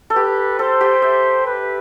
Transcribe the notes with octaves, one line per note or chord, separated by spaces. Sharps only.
A4
G4 B4
A4 C5
G4
E5
B4